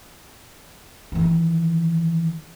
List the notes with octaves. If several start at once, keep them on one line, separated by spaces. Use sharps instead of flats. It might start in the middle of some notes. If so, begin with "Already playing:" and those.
D#3 E3